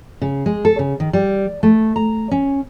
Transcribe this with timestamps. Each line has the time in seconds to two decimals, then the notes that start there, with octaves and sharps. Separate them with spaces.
0.22 C#3
0.46 G#3
0.65 A4
0.79 C#3
1.00 D#3
1.13 G3
1.63 A3
1.96 A#5
2.31 C#4